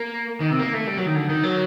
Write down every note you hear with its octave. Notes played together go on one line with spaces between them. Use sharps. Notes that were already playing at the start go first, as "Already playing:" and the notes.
Already playing: A#3
D#3
C3
A#3
A3
G3
F#3
D#3
D3
D#3
F#3